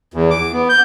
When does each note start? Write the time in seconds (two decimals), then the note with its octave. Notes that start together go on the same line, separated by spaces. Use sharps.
0.14 E2
0.31 D6
0.53 B3
0.69 G6